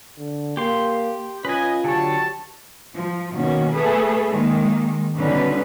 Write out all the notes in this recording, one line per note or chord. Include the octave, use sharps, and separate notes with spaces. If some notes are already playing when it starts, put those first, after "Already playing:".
D3
A#3 G4 C6
C#4 F4 B4 D#5 G#5
D3 F#3 G4 C#5 A5
F3
B2 D#3 A#3 C#4 F#4
A3 G#4 A4 B4
D#3 G#3 A#3
B2 D3 G3 C#4 D#4 B4